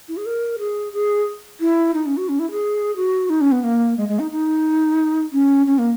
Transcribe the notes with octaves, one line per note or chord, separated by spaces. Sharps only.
E4
G#4
A#4
G#4
G#4
E4
D#4
C#4
F#4
C#4
E4
G#4
F#4
D#4
C#4
B3
A#3
G#3
G#3
D#4
D#4
C#4
C#4
A#3